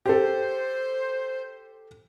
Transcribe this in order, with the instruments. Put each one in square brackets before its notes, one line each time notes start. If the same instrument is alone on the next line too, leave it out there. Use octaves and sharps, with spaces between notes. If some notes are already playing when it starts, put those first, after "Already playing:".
[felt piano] G4 A4 [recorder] C5